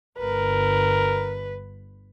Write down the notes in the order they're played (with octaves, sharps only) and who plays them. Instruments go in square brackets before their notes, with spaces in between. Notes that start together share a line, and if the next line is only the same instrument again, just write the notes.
[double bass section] G1 [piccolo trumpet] A#4 [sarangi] B4